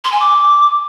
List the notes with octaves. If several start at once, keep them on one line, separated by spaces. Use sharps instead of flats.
C6
G#5
D6